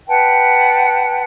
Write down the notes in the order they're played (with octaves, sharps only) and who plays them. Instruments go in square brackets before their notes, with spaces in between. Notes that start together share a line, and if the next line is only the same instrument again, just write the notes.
[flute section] B4 F#5 G5 A5